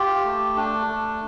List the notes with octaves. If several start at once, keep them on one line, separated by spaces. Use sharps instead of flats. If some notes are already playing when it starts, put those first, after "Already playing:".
Already playing: F4 G4
A3
D4
A3